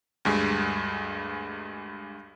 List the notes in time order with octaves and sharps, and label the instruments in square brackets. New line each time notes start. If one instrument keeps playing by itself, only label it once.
[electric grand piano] D2 G2 G#3